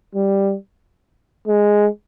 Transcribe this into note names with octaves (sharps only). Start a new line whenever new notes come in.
G3
G#3